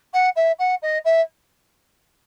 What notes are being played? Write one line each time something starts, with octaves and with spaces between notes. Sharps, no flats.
F#5
E5
F#5
D#5
E5